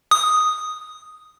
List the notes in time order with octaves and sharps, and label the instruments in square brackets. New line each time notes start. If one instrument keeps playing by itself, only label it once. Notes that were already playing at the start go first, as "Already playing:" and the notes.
[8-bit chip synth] D#6